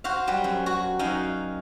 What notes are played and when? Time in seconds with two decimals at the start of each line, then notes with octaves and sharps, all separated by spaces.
0.04 F#4 C5 F5
0.27 F#3 G3
0.44 F#2
0.66 F#4
0.99 F#2 D#4 F5